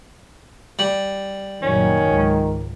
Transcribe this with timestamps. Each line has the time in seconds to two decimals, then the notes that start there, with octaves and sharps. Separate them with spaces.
0.79 G3
1.62 F#1 A#2 D#3 F#3 C#4
2.04 C#2 G#2